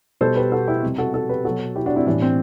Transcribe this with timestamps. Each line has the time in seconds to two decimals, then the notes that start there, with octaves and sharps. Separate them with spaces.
0.21 B2 G3 A4 C5
0.36 G4 B4
0.52 F#4 A4
0.67 E4 G4
0.83 C3 G3
0.98 F#4 A4
1.14 F#4 A4
1.29 G4 B4
1.44 B2 F#3 F#4 A4
1.76 E4 G4
1.86 D4 F#4
1.96 C4 E4
2.06 A2 E3 G3 D4
2.22 C4